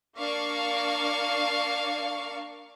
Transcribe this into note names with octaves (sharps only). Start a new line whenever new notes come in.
A#3 D4 F5 C#6